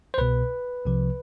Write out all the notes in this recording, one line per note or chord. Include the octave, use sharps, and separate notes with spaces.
C5
C2 B2 B4
C2 C3 F3